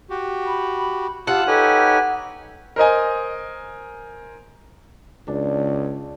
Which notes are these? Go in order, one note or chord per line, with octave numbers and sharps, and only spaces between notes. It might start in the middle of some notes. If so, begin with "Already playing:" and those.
F#4 G4
B5
F4 G4 F#5 A5 E6
D#4 G4 A4 B4 C#5 G#5
A#4 C5 D#5 G#5
C#2 D4